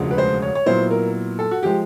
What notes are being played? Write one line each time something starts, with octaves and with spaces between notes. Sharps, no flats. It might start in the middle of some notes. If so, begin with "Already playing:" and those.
Already playing: E1 D2 C#3 F3 G#3
B4
C5
C#5
C#5
A#2 F#3 B3 E4 C5
A#4
A4
F#4
F3 G#3 G4